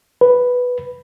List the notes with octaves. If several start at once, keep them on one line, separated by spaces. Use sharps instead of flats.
B4